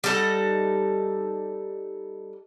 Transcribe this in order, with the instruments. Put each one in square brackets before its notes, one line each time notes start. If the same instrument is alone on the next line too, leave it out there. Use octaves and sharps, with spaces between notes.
[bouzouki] G3 D#4 A4 F#5